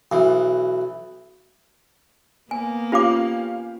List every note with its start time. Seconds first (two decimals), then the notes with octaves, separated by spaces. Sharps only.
0.12 B1 E3
2.51 A#3 B3 G#5
2.92 C#4 F4 G4 F5 D6